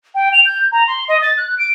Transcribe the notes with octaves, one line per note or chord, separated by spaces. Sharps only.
G5
F7
G6
A#5
C6
D#5
A6
F#6
D7